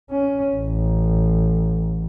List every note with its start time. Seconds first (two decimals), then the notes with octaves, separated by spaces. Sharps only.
0.11 C#4
0.55 A1